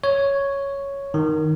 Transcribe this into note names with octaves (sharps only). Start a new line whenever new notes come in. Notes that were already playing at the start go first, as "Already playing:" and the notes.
C#5
D#3